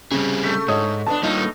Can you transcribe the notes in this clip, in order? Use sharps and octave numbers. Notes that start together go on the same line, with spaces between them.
C#3 G3 C4 G#4
A3 B6
G#2 C#5 D#5 D#6
D3 B3 D4 A5
A2 G3 A#3 D#4 F4